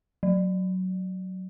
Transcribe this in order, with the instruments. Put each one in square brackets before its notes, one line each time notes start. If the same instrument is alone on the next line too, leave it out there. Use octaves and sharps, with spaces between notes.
[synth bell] F#3